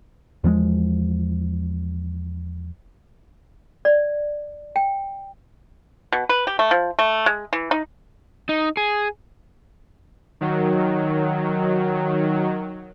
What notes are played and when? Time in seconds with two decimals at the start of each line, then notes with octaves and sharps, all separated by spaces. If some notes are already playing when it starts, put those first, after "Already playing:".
0.44 E2 F3 G3 G#3
3.85 D5
4.76 G5
6.12 B2
6.29 B4
6.47 G4
6.59 A3
6.71 F3
6.99 A3
7.26 G#3
7.53 E3
7.71 D#4
8.49 D#4
8.77 G#4
10.41 D#3 F#3